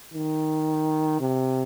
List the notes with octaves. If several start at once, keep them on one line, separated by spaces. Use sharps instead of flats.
D#3
C3